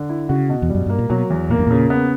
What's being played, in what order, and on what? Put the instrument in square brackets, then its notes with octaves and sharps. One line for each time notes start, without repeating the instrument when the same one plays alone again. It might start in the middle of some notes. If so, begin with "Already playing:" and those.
Already playing: [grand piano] D3
E4
[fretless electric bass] C#3 [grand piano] F#4
[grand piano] B2
[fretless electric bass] E2
[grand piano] G3
[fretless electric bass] F#2
[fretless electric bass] G2 [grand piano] A#3
[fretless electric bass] A#2
[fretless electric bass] B2 [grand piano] F#3
[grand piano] E2
[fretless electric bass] A#2 [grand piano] A#3
[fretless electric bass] G2
[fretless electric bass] A#2 [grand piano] C#3
[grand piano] B3